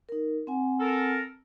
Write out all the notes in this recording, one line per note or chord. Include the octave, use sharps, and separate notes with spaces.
D#4 A#4
C4 F#5 G#5
A4 A#4